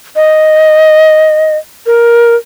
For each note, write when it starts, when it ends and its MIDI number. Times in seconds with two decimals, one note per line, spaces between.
0.16 1.57 75
1.86 2.35 70